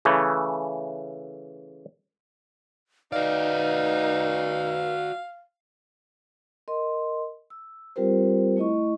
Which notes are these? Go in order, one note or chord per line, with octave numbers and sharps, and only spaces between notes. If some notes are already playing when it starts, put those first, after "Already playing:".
C#3 E3 A3
D#4 F#4 B4 D5 F5
A#4 D#5 C6
E6
G3 C4 F4 G4 A#4 C5
A3 E4 D#5 C#6